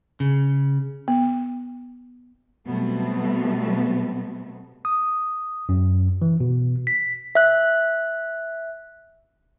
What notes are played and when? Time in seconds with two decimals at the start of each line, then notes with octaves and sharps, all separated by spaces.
0.20 C#3
1.08 B3
2.67 B2 F#3 G3 A3 B3 C4
4.85 D#6
5.69 F#2
6.22 E3
6.41 B2
6.87 B6
7.35 E5 F#6